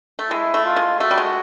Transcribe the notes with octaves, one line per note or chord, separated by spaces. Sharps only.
A3
G#3 E4
A3
F4
G#3
A3 F#4
G3
G#3